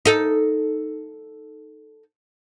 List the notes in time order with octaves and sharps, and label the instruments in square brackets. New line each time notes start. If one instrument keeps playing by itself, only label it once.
[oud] D#4 A4